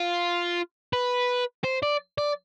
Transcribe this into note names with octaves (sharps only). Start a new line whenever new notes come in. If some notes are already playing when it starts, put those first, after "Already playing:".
Already playing: F4
B4
C5
D5
D5